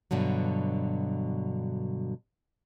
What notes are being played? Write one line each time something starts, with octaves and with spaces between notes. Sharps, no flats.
G2 B2 D3 F#3